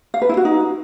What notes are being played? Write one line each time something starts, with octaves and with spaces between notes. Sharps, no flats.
F5
B4
E4
F#4
D#4